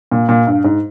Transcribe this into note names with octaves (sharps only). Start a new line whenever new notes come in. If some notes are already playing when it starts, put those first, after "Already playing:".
A#2
A#2
G2
G#2